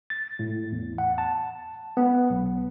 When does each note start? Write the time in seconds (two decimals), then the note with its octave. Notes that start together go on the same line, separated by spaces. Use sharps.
0.10 A6
0.39 A2
0.72 E2
0.98 F#5
1.18 A5
1.97 B3
2.30 B1